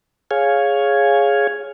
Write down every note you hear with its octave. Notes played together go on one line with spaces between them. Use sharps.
G#4 C#5 F5 G#5